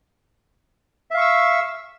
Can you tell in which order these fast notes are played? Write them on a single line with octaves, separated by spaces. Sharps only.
E5 F5 C#6 E6